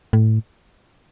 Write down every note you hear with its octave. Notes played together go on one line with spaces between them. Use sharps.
A2